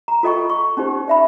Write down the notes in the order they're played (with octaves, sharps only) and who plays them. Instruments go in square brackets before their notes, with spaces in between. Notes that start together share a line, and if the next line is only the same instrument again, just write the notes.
[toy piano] A#5
F4 A4 D#5 G5 C#6
C#6
C#4 D#4 G4 C5
D5 E5 B5